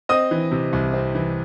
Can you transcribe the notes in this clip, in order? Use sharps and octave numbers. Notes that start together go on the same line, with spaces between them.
C4 D#5 D#6
E3
C3
C2
C4
E3